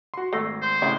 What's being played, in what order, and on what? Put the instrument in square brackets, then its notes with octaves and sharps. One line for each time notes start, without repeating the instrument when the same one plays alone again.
[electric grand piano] F#4 C6
[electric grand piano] G#1 A#6 C7 [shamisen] A3
[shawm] C5
[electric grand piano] A2 C#3 [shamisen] D4 E4